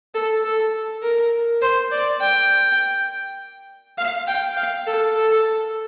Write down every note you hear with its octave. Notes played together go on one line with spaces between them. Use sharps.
A4
A4
A#4
C5
D5
G5
F5
G5
F5
A4
A4